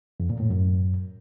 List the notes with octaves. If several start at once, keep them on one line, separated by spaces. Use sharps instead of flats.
F2
A#2
A2
F#2